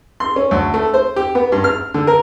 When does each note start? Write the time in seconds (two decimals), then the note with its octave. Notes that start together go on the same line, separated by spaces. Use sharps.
0.20 C6
0.36 C#4
0.51 D2
0.74 A3
0.94 C5
1.16 G4
1.35 B3
1.52 G2
1.64 F6
1.94 D3
2.07 A#4